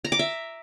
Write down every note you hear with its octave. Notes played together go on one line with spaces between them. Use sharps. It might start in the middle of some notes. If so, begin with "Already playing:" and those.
A#5
D6
E5